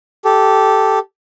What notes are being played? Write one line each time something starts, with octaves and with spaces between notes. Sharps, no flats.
G4 A4